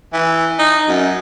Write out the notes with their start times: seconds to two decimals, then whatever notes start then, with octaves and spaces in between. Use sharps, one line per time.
0.13 E3
0.59 D#4
0.88 F#2